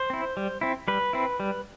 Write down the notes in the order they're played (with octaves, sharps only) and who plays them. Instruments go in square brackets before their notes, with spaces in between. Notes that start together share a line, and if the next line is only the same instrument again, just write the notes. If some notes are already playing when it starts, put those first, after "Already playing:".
Already playing: [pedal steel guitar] C5
C4 E4
G3
C4 E4
G3 B4
C4 E4
G3